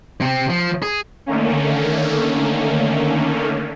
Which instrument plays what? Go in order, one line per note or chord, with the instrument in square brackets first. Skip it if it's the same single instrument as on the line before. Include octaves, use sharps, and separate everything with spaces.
[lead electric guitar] C3 C4
F3
G#4
[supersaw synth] D3 D#3 A3 A#3 C#4